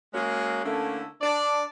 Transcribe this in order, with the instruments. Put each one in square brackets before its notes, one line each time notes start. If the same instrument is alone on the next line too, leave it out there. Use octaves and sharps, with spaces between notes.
[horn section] G#3 A#3 C#4 F#4 G#4
D3 A3 A#3 C#4 E4
D4 D5